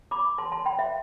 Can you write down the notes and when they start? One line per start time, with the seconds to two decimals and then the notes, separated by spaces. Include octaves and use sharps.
0.11 B5 D6
0.38 A5 C6
0.52 A5 C6
0.66 G5 B5
0.79 E5